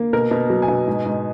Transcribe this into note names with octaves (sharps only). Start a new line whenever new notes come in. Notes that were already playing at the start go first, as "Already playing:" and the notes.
Already playing: A#3
B2 A#4
B2
F#3
G#5
B2
G#2
G#2